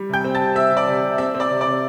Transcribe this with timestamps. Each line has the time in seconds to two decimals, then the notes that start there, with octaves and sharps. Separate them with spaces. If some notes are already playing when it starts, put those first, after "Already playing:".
Already playing: G3
0.09 C3 G5 G6
0.24 C4
0.35 A5 A6
0.41 C3
0.55 C4 E5 E6
0.71 C3
0.77 D5 D6
0.88 C3
1.03 C3
1.18 C4 E5 E6
1.35 C4
1.40 D5 D6
1.50 C3
1.61 D5 D6
1.66 C3